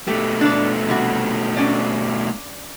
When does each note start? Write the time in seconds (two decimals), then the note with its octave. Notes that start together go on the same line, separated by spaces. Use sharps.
0.08 B2 A3 G4
0.41 D4 A4 D5
0.88 C3 G3 F#4
1.57 C#4 D4 D5